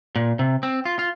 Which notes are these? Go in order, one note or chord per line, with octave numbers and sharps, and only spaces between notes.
A#2
C3
C4
F4
F4